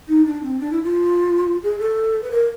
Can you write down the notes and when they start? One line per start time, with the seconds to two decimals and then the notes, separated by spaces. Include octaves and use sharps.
0.08 D#4
0.25 D4
0.43 C4
0.60 D4
0.72 E4
0.83 F4
1.63 G#4
1.80 A4
2.23 B4
2.31 A#4